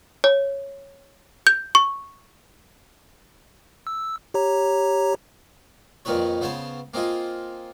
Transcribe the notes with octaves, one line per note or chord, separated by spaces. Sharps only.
C#5
G6
C#6
E6
G4 C#5 A#5
F2 A#2 D#3 D#4 B4 C#5
C#3 B3 C5 C#5 A5
A#3 C4 D#4 F4 G#4